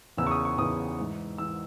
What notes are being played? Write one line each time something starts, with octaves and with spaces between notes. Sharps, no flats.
E2 C#3 E3 E6
C#6
D#6
C#6
E2 C#3 E3 D#6
G#2 E3
E3 E6